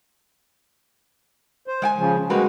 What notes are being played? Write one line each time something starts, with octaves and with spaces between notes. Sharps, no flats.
C5
G#3 G5 G#5
C#3 F3
G3 G#3 A#3 F#4 B4